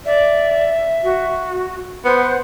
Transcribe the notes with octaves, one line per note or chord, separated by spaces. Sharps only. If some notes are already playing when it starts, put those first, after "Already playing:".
D5 E5
F#4
B3 C5 F#5